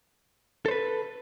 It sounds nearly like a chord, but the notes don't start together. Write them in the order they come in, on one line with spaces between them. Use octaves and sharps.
A4 C5 B4